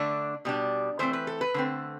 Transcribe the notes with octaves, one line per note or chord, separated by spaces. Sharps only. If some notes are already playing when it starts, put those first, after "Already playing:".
Already playing: D3 A3 D4
B2 G3 D4
E3 A3 C4 C5
B4
A4
B4
D3 A3 C4